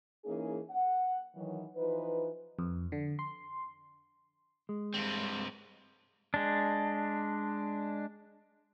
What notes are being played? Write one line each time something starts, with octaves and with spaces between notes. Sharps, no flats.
E3 A#3 C#4 D#4 G#4
F#5
D#3 E3 F#3
E3 F3 D#4 B4
F2
D3
C6
G#3
G2 C4
G#3 D4